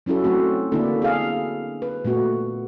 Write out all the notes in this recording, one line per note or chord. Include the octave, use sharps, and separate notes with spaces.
F#3 C#4 E4 F#4 A4
F#3 A3 C4 F#4
D3 A#3 B3 D4 E4 A4
G#4 F5
B4
A#2 A3 B3 F#4